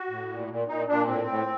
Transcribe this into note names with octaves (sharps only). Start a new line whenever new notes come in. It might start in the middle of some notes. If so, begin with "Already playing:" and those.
Already playing: F#4
A2
A#2
A#2
A#2 D#4
A#2 D4
A2 C4
A2